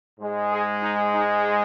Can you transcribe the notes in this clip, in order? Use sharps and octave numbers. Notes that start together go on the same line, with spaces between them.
G#2 G#3
G#4
D#4
D#4